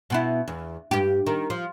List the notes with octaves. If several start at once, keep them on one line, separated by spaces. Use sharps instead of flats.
B2 B3 E4
E2
G2 G4
D#3
F3